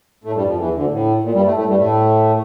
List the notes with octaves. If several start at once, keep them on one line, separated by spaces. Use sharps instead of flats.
A2 A3
G2 G3
F2 F3
E2 E3
D2 D3
A2
A#2
G2 G3
A2 A3
A2 A3
G2 G3
A2 A3